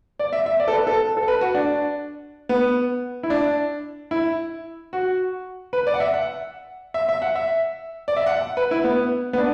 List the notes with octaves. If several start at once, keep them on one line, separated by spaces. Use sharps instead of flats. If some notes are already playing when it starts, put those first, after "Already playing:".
D5
E5
E5
D5
A4
B4
A4
A4
B4
F#4
D4
B3
E4
D4
E4
F#4
B4
D5
F#5
E5
F#5
E5
E5
F#5
E5
D5
E5
F#5
F#5
B4
E4
B3
B3
D4